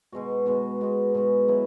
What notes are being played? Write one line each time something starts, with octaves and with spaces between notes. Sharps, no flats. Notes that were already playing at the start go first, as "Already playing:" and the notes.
B2 G#3 B3 F#4
B2 G#3 B3 F#4
B2 G#3 B3 F#4
B2 G#3 B3 F#4
B2 F#3 B3 E4